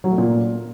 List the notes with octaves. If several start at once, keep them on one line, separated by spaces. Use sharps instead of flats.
F#3
A3
A#2